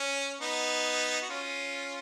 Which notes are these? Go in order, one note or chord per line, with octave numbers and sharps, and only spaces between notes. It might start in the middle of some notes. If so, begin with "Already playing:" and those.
Already playing: C#4
B3 D#4
F#4
C#4 F4